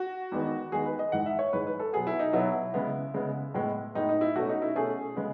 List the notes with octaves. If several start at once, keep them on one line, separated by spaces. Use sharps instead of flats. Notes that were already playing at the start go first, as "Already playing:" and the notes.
Already playing: F#4
E2 D#3 G#3 B3
E2 D#3 G#3 B3 G#4
B4
D#5
G#2 E3 G#3 F#5
E5
C#5
G#2 E3 G#3 B4
B4
A4
B2 F#3 B3 G#4
E4
D#4
B2 F#3 B3 E4
C#3 G#3 B3
C#3 G#3 B3
A2 G#3 B3
A2 G#3 B3 D#4
D#4
E4
B2 A3 C#4 F#4
D#4
E4
B2 A3 C#4 G#4
C#3 G#3 B3